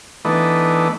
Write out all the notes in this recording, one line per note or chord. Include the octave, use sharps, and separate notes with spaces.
E3 A3 B3 D4 D#4